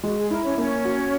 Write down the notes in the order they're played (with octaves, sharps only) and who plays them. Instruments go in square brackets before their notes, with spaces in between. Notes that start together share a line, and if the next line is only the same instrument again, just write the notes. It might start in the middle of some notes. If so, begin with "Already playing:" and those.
[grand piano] G#3 [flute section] F#4
[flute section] G#4
[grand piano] E4 [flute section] A#4
[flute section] C#4 C#5
[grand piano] A#3 [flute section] C#4 C#5
[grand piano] F#4